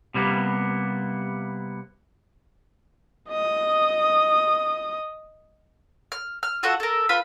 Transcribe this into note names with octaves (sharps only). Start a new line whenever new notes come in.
C3 G3 A#3 B3
D#5 D#6
F6
F6
F4 F#4 A4 F#5
A4 A#4
F4 B4 B5